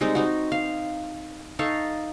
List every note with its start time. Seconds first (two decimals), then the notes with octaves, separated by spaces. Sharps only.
0.01 G3 G#3 C4 D#4
0.15 C4 D#4 F#4
0.52 F5
1.59 D#4 A4 F5 C#6